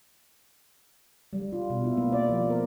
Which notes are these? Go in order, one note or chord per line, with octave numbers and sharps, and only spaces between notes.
G3
F4
B2
E4
A#3
D5
F3
A#4